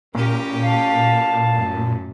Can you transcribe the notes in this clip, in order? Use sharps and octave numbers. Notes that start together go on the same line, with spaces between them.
A#2 C#3 C#4 G4 A#4
F5 A5
F#2 A2